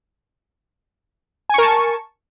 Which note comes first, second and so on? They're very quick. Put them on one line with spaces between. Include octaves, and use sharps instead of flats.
G#5 C#6 A#4 A5